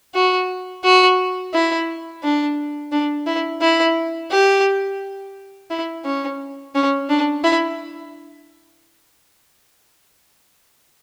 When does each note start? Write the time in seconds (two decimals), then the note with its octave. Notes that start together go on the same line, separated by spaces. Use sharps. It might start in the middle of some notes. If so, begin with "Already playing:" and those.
0.14 F#4
0.84 F#4
1.54 E4
2.23 D4
2.92 D4
3.27 E4
3.61 E4
4.31 G4
5.70 E4
6.05 C#4
6.75 C#4
7.10 D4
7.44 E4